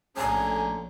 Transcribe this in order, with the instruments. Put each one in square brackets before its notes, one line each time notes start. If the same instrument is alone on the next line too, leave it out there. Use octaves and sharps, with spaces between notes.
[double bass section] A#1 A3 [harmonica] D3 C#4 A#5 [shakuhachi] G#5